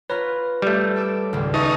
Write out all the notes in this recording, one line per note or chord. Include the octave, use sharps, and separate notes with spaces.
F4 B4 C#5 A#5 B5
G3 A3
A4 D6 E6
D#1 G#1 C#2
D#4 B4 E5 A5 C#6